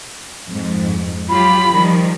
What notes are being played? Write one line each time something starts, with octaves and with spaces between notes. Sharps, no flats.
F2 G#2
F#3 F4 G4 B5
D#3 F3 G3